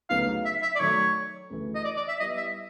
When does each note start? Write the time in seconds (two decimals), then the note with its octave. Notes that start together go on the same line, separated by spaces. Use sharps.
0.09 D2 C#3 F#3 B3 D#4 F5
0.45 E5
0.62 E5
0.76 D5
0.80 D#3 F#3 A3 C#5
1.50 D2 C#3 E3 A3
1.75 D#5
1.84 D5
1.97 D5
2.08 E5
2.20 G3 B3 E4 D#5
2.37 E5